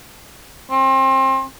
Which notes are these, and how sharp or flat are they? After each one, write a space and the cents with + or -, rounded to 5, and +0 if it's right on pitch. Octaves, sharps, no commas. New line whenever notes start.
C4 +30